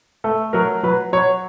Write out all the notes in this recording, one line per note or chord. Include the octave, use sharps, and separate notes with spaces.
A3 A4
F#3 A#4
F#3 B4
F#3 C#5